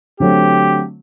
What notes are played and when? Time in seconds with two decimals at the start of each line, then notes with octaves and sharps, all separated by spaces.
0.20 D3 F#3 A3 C4 G4